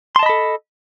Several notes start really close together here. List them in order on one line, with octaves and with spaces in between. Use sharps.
C6 A5 D#5 B5 A4